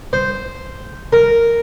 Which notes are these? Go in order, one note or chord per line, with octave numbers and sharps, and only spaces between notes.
C5
A#4